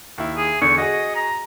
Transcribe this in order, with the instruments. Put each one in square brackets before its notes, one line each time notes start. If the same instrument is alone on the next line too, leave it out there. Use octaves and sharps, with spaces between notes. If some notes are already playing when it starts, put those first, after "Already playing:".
[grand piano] D#2 E4
[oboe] G#4
[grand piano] E2 D3 [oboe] C#6
[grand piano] F#4 G#4 [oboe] D#5
[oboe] A#5